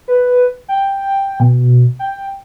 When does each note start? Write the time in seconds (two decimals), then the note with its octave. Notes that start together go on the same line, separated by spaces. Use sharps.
0.08 B4
0.68 G5
1.40 B2
1.99 G5